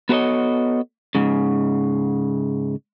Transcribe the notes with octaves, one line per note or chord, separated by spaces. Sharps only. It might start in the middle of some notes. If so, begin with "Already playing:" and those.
B3 F#4 A4 B4 C#5 D#5
G#2 C#3